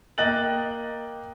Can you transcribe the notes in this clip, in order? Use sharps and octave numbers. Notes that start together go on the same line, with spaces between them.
A#3 D#5 G5 F#6 A6 F#7